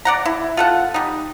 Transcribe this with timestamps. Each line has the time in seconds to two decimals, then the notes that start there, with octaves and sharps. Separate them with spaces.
0.05 D5 F#5 A#5
0.25 E4
0.57 F4 A4 F#5
0.94 G3 D#4